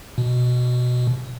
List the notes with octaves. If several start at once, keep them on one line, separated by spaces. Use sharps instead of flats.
B2